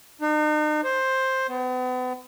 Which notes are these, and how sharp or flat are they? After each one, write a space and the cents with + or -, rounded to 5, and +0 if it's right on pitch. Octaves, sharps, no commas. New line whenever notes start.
D#4 -40
C5 +10
B3 +40